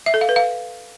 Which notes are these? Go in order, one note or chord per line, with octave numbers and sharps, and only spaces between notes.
E5
A4
F5
B4
F5